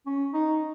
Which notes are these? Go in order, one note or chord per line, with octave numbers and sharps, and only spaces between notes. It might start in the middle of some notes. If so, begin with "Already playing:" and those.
C#4
D#4